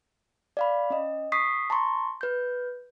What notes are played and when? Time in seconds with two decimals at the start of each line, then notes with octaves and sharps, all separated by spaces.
0.57 D5 F5 B5
0.90 C#4 D#5
1.32 C#6 D#6 B6 C7
1.70 A5 A#5 C6 C#6
2.21 B4 G6